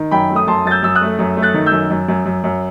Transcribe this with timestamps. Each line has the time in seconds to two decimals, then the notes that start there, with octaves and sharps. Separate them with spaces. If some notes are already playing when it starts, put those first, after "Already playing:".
Already playing: D#3
0.11 F#2 G5 B5
0.30 A3
0.36 D#6
0.47 F#2 A5 C6
0.66 F#2 A6
0.71 E6 G6
0.83 F#2 E6
0.95 D#6 F#6
1.01 A3
1.19 F#2
1.37 A3
1.42 F#6 A6
1.54 D#3
1.66 E6 G6
1.72 F#2
1.90 F#2
2.08 F#2
2.26 F#2
2.44 F#2